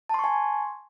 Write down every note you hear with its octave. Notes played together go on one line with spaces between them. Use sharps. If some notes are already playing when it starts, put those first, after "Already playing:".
G#5 A5 C6 C#6